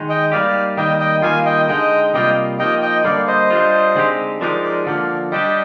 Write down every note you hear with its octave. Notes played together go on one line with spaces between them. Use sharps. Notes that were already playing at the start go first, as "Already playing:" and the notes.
Already playing: D#3 G#3 D#4
D#5 G5
G3 A#3 D#4 G4 D5 F5
D#3 G3 A#3 D#5 G5
D#5 G5
D#3 G3 A#3 F4 F5 G#5
D#5 G5
D3 G#3 D#4 D#5 G5
C3 G3 A#3 F4 D#5 G5
F3 A#3 D#4 D#5 G5
D#5 G5
D3 G3 A#3 D5 F5
C5 D#5
G3 D4 F4
D3 G#3 C4 D#4 G4
F3 G#3 D#4 G4 A#4 D5
A#4 D5
D3 F3 A#3 D5 F5
G3 D4 G4 D#5 G5